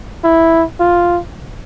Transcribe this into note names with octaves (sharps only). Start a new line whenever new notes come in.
E4
F4